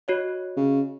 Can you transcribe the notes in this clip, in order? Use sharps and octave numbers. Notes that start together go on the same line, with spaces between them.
F#4 C#5 D#5
C#3